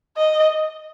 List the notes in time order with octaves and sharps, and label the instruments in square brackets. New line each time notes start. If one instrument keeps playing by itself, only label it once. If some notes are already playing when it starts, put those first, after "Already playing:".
[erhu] D#5